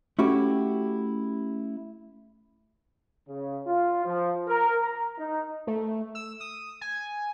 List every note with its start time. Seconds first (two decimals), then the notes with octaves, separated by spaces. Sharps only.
0.19 A3 C#4 E4 F#4 G4
3.28 C#3
3.67 F4
4.05 F3
4.48 A#4
4.84 A#5
5.18 D#4
5.67 A3
6.15 E6
6.40 D#6
6.81 G#5